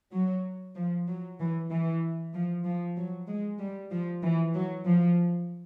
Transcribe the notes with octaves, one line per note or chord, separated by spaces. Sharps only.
F#3
F3
F#3
E3
E3
F3
F3
F#3
G#3
G3
F3
E3
F#3
F3